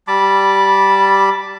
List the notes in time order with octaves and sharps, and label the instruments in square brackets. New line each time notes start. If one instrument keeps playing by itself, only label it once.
[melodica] G3 A5 B5 D6